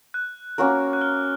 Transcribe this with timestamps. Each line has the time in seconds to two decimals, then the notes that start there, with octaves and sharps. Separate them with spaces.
0.14 F#6
0.58 A#3 C#4 F#4 A#4
0.93 F#6
1.01 F6